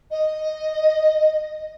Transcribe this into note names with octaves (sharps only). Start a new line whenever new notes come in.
D#5